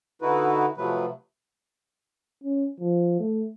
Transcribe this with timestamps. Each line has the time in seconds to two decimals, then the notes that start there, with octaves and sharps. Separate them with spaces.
0.22 D3 D#4 E4 F#4 B4
0.77 C3 F3 F#3 A3 B4
2.44 C#4
2.80 F3
3.20 A3